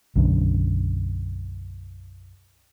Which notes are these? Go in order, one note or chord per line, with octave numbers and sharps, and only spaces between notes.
B1 F#2 D3